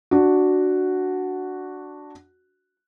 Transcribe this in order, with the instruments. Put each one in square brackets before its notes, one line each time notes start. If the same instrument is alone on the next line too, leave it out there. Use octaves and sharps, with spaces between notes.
[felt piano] D4 F#4